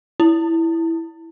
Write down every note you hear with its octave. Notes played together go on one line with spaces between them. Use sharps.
E4